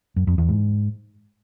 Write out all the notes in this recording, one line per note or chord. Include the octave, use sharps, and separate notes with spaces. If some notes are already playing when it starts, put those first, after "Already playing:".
F#2
F2
E2
G#2